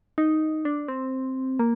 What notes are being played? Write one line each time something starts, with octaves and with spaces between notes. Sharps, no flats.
D#4
D4
C4
A#3